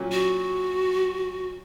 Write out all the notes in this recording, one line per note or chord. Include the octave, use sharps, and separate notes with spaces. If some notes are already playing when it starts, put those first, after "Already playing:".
Already playing: A#2 F#3 C#4
F#4